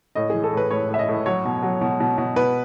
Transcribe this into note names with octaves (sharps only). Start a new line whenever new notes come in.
A2 D#5
E3 G#4
A4
A2 B4
A2 C#5
A2
E5
D#5
A2
F#3 C#5
B2
F#3
B2
B2
B2
B2 B4